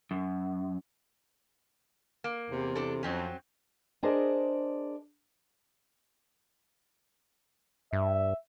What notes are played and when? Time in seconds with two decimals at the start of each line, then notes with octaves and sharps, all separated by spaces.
0.11 F#2
2.24 A#3
2.49 E2 C3
2.75 D4 A4
3.03 F2 F#3 C4 C#4
4.03 D4 G#4 A#4 C5 D5 D#5
7.93 G2 E5